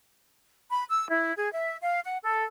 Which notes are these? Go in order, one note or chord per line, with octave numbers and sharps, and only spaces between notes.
B5
E6
E4
G#4
E5
F5
F#5
A4